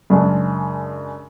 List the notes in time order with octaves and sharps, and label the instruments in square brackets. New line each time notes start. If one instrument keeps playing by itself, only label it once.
[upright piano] F#2 C#3 G#3 D4